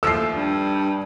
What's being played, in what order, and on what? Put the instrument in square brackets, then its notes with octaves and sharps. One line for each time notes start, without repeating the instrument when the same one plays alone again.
[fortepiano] D#2 F3 A3 [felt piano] E6 C7
[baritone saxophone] G2